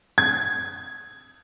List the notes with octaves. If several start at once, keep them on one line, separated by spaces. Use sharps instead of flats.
G#6